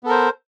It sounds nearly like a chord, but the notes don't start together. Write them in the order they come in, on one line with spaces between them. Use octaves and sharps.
B3 A4 A#4 C5